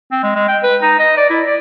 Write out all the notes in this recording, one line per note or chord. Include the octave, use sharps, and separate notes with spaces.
C4
G#3
G#3
G5
B4
D#4
D#5
D5
E4
D5